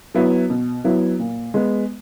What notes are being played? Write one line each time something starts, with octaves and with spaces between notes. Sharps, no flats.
F#3 B3 E4
B2
F#3 B3 E4
A#2
G#3 B3